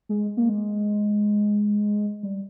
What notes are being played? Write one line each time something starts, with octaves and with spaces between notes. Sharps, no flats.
G#3
A#3
G#3
G3